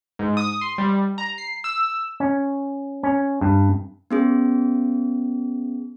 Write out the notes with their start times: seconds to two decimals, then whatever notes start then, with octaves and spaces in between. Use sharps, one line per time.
0.19 G#2
0.37 D#6
0.61 C6
0.78 G3
1.18 A#5
1.38 C7
1.64 E6
2.20 C#4
3.03 C#4
3.41 G2
4.11 B3 C#4 G#4